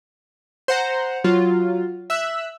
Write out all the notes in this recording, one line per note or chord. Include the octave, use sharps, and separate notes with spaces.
C5 F#5 A#5
F#3 F4
E5 E6 F#6